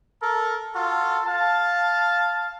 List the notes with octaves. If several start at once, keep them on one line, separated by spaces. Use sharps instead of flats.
A4 A#4
F4 F#4 A4
F5 A5